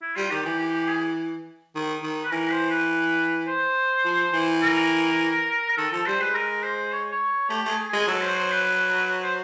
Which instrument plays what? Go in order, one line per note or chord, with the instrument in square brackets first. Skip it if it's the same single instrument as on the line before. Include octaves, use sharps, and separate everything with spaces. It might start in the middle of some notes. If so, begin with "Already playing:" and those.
[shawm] E4
[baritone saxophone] G3 [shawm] F4
[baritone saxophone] D#3 [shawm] G4
[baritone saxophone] E3 [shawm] G4
[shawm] G4
G4
G#4
[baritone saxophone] D#3
D#3
[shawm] B4
[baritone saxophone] E3 [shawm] A#4
[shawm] C5
B4
C5
[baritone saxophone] F3
E3
[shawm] A#4
A#4
[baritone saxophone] D#3 [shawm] A4
[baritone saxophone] F3 [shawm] A4
[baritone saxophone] G3 [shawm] C5
[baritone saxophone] G#3 [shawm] B4
[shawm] A#4
C5
C#5
C#5
[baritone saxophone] A3 [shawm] G4
[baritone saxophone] A3 [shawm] G#4
[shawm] G#4
[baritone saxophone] G#3
[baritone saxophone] F#3 [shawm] A4
[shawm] C5
C5
B4
C5